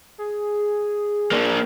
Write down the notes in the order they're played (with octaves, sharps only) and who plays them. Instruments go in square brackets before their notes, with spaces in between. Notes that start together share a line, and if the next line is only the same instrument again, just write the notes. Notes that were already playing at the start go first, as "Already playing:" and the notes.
[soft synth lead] G#4
[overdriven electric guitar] A#3 D4